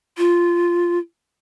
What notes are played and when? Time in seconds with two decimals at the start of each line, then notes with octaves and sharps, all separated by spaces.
0.18 F4